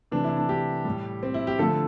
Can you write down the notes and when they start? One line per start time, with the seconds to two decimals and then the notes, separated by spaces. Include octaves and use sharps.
0.11 C3 E3 A3 D4
0.24 E4
0.37 D4
0.49 G4
0.85 A2 G3
1.23 C4
1.34 E4
1.47 G4
1.59 D3 F3 A3 A4